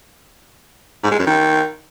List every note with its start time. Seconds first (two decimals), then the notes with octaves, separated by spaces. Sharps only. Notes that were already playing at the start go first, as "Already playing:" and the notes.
1.04 G#2
1.11 G#3
1.19 F#2
1.27 D#3